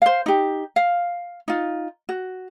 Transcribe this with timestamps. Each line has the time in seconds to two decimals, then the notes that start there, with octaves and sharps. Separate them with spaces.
0.02 C5 F5
0.26 D#4 G4
0.76 F5
1.48 D#4 F4
2.09 F#4